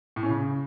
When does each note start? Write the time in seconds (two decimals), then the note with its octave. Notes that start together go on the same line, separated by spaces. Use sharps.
0.16 A2
0.23 C#4
0.29 C#3